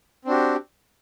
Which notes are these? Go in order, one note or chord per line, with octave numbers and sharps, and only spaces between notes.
C4 D4 F#4 G4